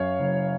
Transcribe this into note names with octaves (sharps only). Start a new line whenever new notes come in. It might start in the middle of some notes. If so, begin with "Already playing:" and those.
Already playing: F#2 C#5 F5
F#1